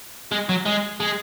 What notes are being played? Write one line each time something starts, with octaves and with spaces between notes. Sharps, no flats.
G#3
F#3
G#3
G#3